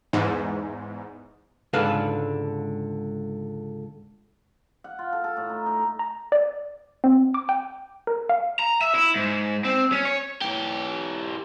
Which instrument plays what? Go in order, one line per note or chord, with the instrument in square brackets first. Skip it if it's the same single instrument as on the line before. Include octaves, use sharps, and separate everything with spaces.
[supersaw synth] E2 G#2
[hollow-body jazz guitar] C#2 G#2 D3 A4 B4 F5
[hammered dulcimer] F#5
F4
A4
A4
A2
D#4
D#4
[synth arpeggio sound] A#5
D5
C4
D6
G5
A#4
F5
[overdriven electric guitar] A#5
E5
E4
G#2
C4
C#4
C#5
E3 G4